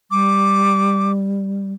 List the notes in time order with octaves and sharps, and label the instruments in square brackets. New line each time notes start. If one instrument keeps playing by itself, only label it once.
[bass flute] G3 [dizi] D6